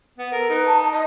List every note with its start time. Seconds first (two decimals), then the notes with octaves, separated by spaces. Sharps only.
0.18 B3
0.33 A4 A#4
0.50 D#4 B4
0.65 A5
0.92 D#5